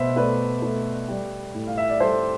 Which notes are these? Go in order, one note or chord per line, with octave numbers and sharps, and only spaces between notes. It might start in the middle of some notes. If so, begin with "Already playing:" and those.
Already playing: B2 A3 B4 C5 E5
A3 B4 D5
A3
G3
A2
F5
E5
D5
G3 A4 C5